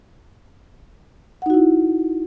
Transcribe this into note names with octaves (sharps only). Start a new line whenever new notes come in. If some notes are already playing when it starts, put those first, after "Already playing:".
D#4 E4 F#4 F#5